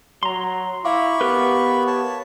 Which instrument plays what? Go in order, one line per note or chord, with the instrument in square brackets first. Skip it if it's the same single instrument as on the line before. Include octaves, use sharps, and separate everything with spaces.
[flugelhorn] F#3 [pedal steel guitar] A#5 C6
[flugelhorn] E4 [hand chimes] E5 F5 D6 [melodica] B5 C#6
[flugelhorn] B3 [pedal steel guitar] G4 A#4 B4
[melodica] C#5 A5